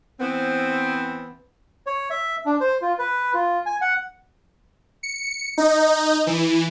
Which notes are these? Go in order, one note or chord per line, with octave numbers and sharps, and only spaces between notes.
E3 B3 C4
C#5
E5
D4
C5
F4
B4
F4
G#5
F#5
C#7
D#4
E3